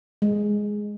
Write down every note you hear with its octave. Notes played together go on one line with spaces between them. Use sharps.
G#3